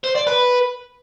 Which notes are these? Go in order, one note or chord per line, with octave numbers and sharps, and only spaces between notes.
C5
D5
B4